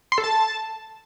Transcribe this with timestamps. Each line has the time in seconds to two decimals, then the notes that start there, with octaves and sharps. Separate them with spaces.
0.12 C6
0.18 A4
0.24 A5